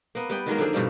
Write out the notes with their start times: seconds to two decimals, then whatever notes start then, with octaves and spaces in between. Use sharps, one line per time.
0.15 A#3 B3
0.30 G3 B3 G5
0.46 D#3 F#3 G#3 A#3
0.58 D3 F3 D4 G#4
0.73 G2 B2 F3 G3